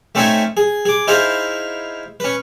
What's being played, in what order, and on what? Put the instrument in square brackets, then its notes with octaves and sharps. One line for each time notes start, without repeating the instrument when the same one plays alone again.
[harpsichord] A3 C4 C#4 D#4 E5 G#5
G#4
G#4 D6
D#4 E4 G#4 C5 F5
C#4 B4